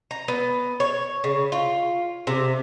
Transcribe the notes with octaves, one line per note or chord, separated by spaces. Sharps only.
A#5
B3
C#5
C#3
F4
C3